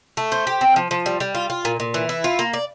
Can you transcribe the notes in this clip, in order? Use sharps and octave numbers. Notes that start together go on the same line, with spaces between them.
A3
C5
G4
C4
F3
F3
G3
G3
F4
F4
A#2
A#2
E3
E4
F4
A#3
D5